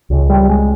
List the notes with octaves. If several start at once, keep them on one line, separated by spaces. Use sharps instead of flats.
C#2 C#3
G3
G#3